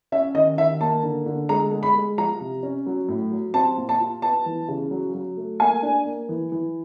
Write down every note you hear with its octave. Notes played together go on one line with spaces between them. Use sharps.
C#4 E5
D#3 D#5
D#3 E5
A#3 A5
D3
D3
G#3 A#5
G#3
B5
G#3
F3 A#5
C3
C#4
F#3
A2
F#3
C4 A5
A#2
A5
F4
B3 A5
E3
C#3
F#3
F#3
A3
A#3 G#5
D4
A#3
E3
E3